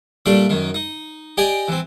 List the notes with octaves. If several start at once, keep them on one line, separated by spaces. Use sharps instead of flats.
A#2 G3 A3 D4 D5
F#2 D#3
D#4
G4 D5 D#5 G#5
E3 C4